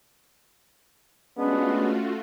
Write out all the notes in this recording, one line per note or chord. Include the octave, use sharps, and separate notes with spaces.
G#3 A3 B3 C#4 D4 F4 F#4